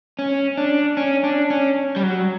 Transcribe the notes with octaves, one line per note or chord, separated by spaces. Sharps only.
C#4
D4
C#4
D4
C#4
G3
F#3